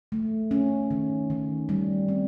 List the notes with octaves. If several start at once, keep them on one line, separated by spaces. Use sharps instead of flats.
A3
C#4
D#3
D#3
G3
C4